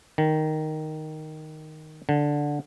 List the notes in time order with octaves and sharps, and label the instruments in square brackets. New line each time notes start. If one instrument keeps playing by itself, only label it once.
[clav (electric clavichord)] D#3
D3